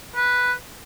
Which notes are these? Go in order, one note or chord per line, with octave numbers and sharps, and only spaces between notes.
B4